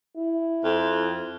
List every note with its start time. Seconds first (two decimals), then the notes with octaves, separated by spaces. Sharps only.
0.16 E4
0.64 F2